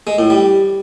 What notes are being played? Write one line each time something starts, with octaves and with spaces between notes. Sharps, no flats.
G#3
A2
G3